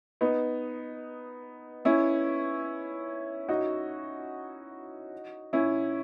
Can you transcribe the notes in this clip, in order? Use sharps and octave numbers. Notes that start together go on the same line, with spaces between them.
B3 D#4
C#4 E4
D#4 F#4
C#4 E4